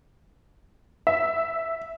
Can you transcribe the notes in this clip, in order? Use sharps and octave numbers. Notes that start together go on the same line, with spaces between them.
E5